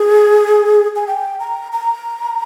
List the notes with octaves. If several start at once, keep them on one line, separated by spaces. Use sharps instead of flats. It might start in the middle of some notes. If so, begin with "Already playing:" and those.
Already playing: G#4
G#5
G5
A#5
A#5